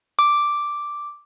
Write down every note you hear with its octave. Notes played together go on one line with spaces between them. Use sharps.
D6